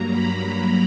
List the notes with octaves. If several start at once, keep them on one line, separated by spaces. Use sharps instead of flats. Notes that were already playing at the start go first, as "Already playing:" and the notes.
Already playing: G2 F#3 A#3 A#5
B5
A#5